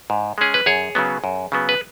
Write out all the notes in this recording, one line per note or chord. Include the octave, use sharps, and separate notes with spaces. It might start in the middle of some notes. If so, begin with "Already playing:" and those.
G#2
G#3 C#4 G#4
B4
F#2 G#4 C#5
C#3 F#3 B3
F#2
C#3 F#3 B3
B4